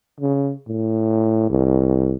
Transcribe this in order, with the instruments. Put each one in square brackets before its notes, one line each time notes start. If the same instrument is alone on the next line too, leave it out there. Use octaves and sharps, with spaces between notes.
[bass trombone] C#3
A2
C2